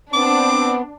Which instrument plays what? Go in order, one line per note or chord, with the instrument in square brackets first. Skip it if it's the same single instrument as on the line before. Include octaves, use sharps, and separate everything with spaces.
[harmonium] B3 [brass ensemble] C4 [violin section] D4 [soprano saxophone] D6